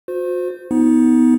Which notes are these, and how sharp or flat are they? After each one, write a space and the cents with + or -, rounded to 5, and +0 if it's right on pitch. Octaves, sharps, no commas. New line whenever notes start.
F#4 -45 C5 -15
B3 +10 D#4 +30